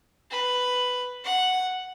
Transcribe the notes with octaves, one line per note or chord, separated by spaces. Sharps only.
B4
F#5